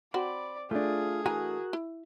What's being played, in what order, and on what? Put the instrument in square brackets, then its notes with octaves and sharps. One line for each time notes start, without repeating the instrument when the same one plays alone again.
[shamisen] C4 F#4 [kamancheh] D5 [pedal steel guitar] B5
[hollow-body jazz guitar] A3 D4 [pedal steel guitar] F4 [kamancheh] G#4
[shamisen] E3 G#5 A#5 [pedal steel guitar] F#4 A#4
[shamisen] E4